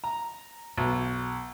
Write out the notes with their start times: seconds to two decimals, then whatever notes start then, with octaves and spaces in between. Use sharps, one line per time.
0.04 A#5
0.77 B1